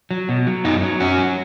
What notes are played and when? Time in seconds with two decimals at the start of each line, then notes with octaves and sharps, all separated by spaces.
0.11 F#3
0.29 B2
0.47 F#3
0.64 F#2 B3 D#4
0.82 F#3
1.00 F#2 C#4 F#4
1.18 F#3